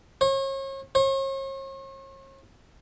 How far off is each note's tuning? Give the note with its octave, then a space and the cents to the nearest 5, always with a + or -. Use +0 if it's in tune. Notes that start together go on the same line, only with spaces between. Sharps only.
C#5 -40
C#5 -45